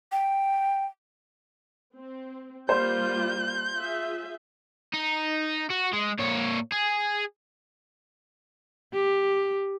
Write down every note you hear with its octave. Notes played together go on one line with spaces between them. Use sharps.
G5
C4
G3 A#3 F4 C5 C6 G6
F4 G#4 E5
D#4
F#4
G#3
A#2 C#5
G#4
G4